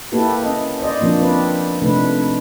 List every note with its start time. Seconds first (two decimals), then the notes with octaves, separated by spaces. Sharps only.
0.12 A#3 E4 G4 A4 B4
0.44 C#4 D#5
0.80 C5 D5 D#5
1.00 F3 A#3 C4 D4
1.20 C4 B4 D5
1.81 C3 F3 A3 D4 D#4 B4